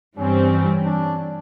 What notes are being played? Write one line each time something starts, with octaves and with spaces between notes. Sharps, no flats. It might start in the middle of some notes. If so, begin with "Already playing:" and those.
G2 E3 G3 C4 C#4
D4